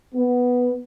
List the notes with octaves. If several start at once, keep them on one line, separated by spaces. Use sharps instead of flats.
B3